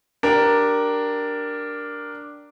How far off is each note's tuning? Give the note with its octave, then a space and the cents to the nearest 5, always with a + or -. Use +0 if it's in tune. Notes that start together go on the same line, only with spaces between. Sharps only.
D4 +0 G4 -20 A#4 +0